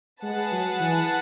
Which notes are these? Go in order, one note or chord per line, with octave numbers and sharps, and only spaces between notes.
G#3 G#4 B4 F#5 A5
F#3
E3